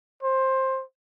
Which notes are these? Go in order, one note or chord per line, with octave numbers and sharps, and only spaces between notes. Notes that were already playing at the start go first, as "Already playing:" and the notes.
C5